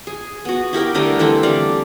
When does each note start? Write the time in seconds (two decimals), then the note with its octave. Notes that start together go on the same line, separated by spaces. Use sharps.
0.07 G#4
0.45 B3 F#4
0.73 E4 G4 A#4 G5
0.95 D3 G3 A3 A#4
1.19 E3 A3 C4 D4
1.43 G3 D5 F5